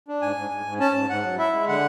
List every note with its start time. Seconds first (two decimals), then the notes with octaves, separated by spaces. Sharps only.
0.08 D4
0.22 G#2 G#5
0.37 G#2
0.51 G#2
0.66 G#2
0.80 C#4 A5
0.94 G#2
1.09 G#2 F#5
1.23 F#3
1.39 E4 E5
1.53 G#3
1.68 D3 F#5